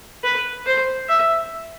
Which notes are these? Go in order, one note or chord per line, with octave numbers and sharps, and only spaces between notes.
B4
C5
E5